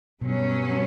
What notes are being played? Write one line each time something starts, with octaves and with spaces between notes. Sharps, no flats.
G2 B2 F#3 C#4